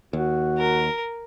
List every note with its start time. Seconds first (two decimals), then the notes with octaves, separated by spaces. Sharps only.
0.13 D#2 F#4
0.57 A#4